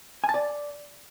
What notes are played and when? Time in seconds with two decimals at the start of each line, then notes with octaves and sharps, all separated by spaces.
0.24 G#5
0.29 A5
0.34 D5